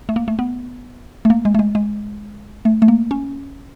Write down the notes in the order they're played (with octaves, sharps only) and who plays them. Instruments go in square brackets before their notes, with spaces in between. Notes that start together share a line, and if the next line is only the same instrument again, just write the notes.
[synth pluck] A3
A#3
A3
B3
A3
A#3
G#3
A3
G#3
G#3
A3
A3
A#3
C#4